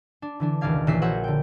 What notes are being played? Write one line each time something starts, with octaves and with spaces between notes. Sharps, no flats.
D4
D3 E3 D4
E1 C#2 D#3 D5 F5 G#6
A#1 E3 C#5 E5 C7
F#4 A#4 C5 C#5 E5 F#5
D3 G5